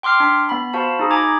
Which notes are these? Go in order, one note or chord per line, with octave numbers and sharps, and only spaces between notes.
G5 C6 D6 F6 C7
D4
B3 B5
F#4 C5 F5 A5 B5
D#4 G#4
G#5 A#5 B5 D6 G#6